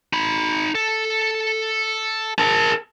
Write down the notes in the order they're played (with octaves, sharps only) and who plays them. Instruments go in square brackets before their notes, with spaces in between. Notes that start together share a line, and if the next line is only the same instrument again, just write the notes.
[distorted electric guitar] D#4 B5
A4
[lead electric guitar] A#4 A5